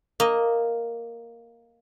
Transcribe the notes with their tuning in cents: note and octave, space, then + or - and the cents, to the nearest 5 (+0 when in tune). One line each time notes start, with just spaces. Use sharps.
A#3 +0 D#5 +0